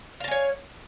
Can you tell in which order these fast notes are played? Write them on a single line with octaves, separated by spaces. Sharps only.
F5 A5 G#5 C#5